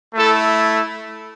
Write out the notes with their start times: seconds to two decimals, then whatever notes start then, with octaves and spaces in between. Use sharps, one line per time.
0.15 A3 E4 A4